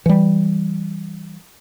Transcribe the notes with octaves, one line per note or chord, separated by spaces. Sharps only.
E3 G3